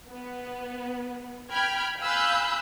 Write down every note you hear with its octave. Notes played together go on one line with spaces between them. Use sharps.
B3
G5 B5 F6 G#6
F5 G#5 B5 E6 F#6 G6